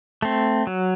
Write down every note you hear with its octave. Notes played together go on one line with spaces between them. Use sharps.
A3 C4
F#3